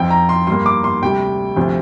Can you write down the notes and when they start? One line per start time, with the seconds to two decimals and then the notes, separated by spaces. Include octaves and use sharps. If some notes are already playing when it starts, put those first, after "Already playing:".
Already playing: F2 F3 C4 G5
0.10 A#5
0.29 C6
0.47 G2 G3 A#3 C6
0.66 D6
0.84 C6
1.02 D2 C3 G3 G5
1.56 D2 C3 F3 C4